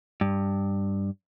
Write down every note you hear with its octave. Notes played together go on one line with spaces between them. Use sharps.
G2